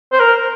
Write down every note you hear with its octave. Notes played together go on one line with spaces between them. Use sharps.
C5
A#4